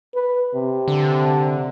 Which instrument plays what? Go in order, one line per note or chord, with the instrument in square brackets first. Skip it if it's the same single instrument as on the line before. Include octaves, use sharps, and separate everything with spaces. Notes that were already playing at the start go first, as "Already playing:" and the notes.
[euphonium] B4
C3
[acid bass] D3